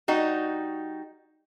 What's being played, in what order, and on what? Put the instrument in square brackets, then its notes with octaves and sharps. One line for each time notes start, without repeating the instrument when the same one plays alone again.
[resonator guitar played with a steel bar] G3 D#4 F#4